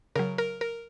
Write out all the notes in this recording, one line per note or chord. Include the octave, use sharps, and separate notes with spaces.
C#3 F#3 A#4
A#4
A#4